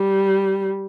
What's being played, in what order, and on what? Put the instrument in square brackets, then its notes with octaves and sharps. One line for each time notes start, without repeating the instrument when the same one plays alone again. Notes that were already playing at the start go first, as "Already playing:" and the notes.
Already playing: [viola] G3